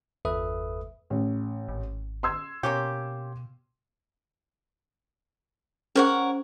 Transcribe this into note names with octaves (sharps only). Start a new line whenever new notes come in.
G1 E2 A4 B4 E5 D#6
A1
G#1
C6 E6 G#6
B2 A#3 C#4 G4
C#4 G#4 A#4 C5 C#5 F#5